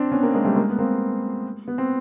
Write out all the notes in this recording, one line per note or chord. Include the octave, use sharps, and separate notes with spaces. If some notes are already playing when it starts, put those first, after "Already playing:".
Already playing: C4 D4
B3 C#4
A#3 C4
G#3 A#3
G3 A3
G#3 A#3
B3
A#3 C4
B3
C4